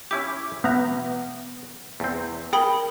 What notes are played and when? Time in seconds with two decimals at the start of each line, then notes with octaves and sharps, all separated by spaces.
0.11 C#4 E4 G4 D6
0.64 B3 E5 A#5
2.00 E2 C4
2.53 G#4 A#4 G5 B5 D#6